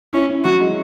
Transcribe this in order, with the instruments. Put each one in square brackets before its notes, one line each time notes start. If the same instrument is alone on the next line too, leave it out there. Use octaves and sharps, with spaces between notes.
[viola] C#4 [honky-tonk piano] E4
[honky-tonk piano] C#4
[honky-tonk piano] F#3 [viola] F#4
[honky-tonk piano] G#3